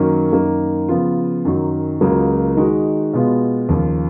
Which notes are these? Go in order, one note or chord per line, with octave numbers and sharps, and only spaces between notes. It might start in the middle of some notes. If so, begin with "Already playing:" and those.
Already playing: F#2 D#3 F#3 A#3 C#4
F#2 D#3 A#3
C#3 F3 B3 F4
F#2 D#3 F#3
C#2 C#3 F#3 A#3 F4
D#3 G#3 D#4 F#4
B2 G#3 B3 F4
D#2 C#3 F3